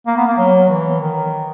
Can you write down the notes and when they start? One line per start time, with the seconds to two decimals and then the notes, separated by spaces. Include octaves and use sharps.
0.07 A#3
0.17 B3
0.27 A#3
0.38 F#3
0.69 E3
1.01 D#3